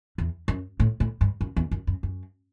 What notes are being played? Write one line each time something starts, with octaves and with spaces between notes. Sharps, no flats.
E2
F#2
A2
A2
G2
F#2
E2
F#2
F#2
F#2